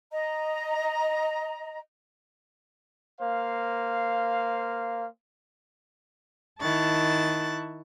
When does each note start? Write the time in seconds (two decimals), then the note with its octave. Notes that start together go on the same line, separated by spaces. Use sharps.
0.11 D#5 A#5
3.21 A#3 C5 F5
6.60 D#3 E4 A5 C#6 F#6 A6